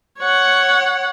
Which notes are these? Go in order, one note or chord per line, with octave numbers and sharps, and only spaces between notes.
C#5 F#5